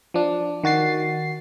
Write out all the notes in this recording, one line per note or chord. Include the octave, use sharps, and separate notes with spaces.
F3 D4
D#3 F#4 A6 C7